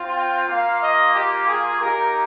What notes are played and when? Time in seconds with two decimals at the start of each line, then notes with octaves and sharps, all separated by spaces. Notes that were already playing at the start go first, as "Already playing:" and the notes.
Already playing: C4 F4
0.14 G5
0.47 A#3 F4 F5
0.81 D#5
1.14 G4
1.47 G#4
1.80 A#3 D#4 G4 A#4